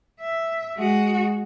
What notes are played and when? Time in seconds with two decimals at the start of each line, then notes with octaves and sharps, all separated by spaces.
0.21 E5
0.78 G#3 F#4